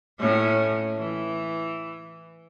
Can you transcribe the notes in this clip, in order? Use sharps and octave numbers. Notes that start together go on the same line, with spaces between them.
A2 C#4
E3